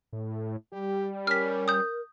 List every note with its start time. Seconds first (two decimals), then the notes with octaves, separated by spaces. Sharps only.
0.13 A2
0.72 G3 G4
1.27 C#4 A#4 F6 B6
1.68 D#6 G6